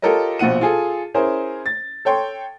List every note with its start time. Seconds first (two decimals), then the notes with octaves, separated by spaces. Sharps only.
0.02 F4 G4 A4 A#4 C#5 D#5
0.39 A#1 B2 F4 F#5 D#7
0.61 F4 G#4 A4
1.14 C#4 E4 G#4 A#4 C5
1.66 A6
2.05 A4 C#5 G5 C6